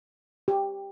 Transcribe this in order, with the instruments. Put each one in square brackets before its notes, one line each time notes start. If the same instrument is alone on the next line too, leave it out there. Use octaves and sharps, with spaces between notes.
[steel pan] G4